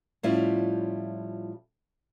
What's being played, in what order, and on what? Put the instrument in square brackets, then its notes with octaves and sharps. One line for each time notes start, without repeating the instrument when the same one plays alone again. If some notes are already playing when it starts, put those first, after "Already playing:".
[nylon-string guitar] A2 F3 G3 C#4 E4 F4